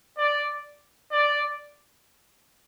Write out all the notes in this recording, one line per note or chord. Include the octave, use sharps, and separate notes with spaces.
D5
D5